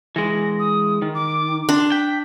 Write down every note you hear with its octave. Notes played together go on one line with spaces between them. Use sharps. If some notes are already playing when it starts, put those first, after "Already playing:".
E3 G#3 A#6
D#6
D#3
D6
D4 C6
G5 B6